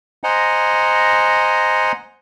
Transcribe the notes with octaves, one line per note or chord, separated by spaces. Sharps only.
C5 D#5 F#5 G#5 A#5